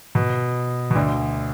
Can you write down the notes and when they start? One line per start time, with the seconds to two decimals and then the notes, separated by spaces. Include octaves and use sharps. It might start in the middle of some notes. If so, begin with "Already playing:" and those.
0.15 B2
0.91 B2
0.95 D2 D3